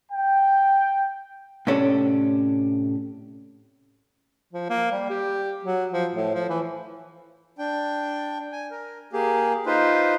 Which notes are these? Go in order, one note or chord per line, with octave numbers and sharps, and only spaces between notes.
G5
A2 C3 C#4 D4 A4
F3
A#3
G3
G4
F#3
F3
A2
F3
E3
D4 G5
G#5
A#4
A#3 G4 G#4
D#4 F4 B4 C5